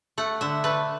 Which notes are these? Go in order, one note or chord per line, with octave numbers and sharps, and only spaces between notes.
A3 F#5
D3 E5
A3 B4